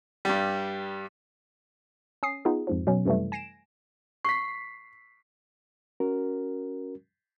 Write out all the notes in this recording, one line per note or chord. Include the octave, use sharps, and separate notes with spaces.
G2 G3
C#4 D#6 C7
B3 D#4 F4 G#4
F2 G#2 F3
B2 F#3 C#4
F#2 C3 E3 G3 A3
G#5 A#6 C7 D7 E7
C#6 B6 C7
C#4 F#4 A#4